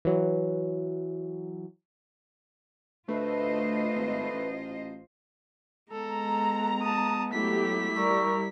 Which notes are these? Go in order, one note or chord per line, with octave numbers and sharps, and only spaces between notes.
E3 F#3
D2 A3 F4 B4 C5 D#5
G#1
A1
G#3 B3 A4 A#5
A5 D#6
F#3 A3 E4 G4 A4 B6
G3 A#4 D5 C#6 E6